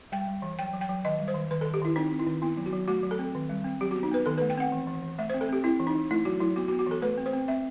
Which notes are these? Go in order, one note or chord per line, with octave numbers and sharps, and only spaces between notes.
G3 G5
G3
E3
F#3 G5
F#3
G5
F#3
D#3 D#5
G3
C5
D#3
D#3 B4
D#3 A4
G4
D#3 E4
C4 D#4
C4
E4
D#3
B3 E4
F#3
F#4
F#3
A3 F#4
F#3
A4
C4
D#3
G3
C4
F#3 G4
B3 F#4
D#4
B3 B4
D#3 A4
A3 B4
G5
C4 F#5
E3
E3
E3
A3 E5
C4 C5
A4
C4 G4
C4 E4
E3
D#4
E3
A3 E4
F#3 F#4
F#3 E4
B3 F#4
F#4
B3
F#4
E3 A4
A3 B4
C4
C5
C4
C4 E5